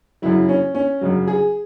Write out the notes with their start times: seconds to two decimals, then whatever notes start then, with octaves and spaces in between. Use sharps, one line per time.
0.22 F#2 C#3 F#3 E4
0.49 C#4
0.75 C#4
1.01 F#2 C#3 F#3
1.27 G#4